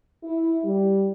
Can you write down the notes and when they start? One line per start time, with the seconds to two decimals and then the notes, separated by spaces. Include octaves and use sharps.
0.24 E4
0.63 G3